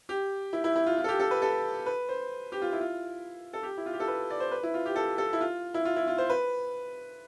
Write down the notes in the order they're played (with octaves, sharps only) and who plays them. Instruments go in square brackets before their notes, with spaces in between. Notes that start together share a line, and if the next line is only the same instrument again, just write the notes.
[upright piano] G4
E4
E4
E4
F4
F4
A4
G4
A4
B4
A4
B4
C5
G4
F4
E4
F4
A4
G4
E4
F4
G4
A4
B4
D5
C5
B4
E4
F4
G4
A4
A4
E4
F4
E4
F4
E4
F4
C5
B4